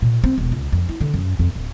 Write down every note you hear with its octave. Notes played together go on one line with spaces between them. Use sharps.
A#2
C4
E1
C#2
F2
E4
D3
F#2
F2
D1